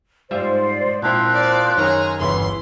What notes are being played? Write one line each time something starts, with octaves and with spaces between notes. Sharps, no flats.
G#2 G3 F4 C5 D5 E5
A#2 F3 A#3 C4 E4 C6 F#6
D5
F#2 D#3 G#4 C#5 A#5
G1 E2 C#3 E3 C6